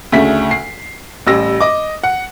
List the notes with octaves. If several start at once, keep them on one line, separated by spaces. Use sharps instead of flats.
D2 C#3 A3 B6
C7
A1 G3 E6 A#6
D#5 D6
F#5